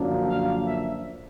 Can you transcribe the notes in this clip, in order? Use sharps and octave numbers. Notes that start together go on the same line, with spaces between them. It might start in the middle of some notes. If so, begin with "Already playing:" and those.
Already playing: F#2 D3 F3 A#3 D4
F5
E5